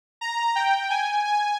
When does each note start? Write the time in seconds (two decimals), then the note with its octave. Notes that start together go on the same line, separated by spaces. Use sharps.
0.21 A#5
0.56 G5
0.90 G#5
1.25 G#5